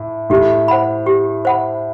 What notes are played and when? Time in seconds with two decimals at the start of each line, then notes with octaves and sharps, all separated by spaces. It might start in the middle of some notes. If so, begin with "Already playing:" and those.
Already playing: A2
0.30 A2 G4
0.68 C5 F#5 B5
1.06 G4
1.45 C5 F#5 B5